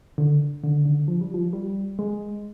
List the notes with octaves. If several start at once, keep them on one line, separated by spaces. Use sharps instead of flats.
D3
D3
D3
F3
G3
F3
G3
G#3